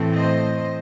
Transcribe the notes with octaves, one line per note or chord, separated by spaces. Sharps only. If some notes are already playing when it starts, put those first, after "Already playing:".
Already playing: A2 E3 A3 C4
C5 D#5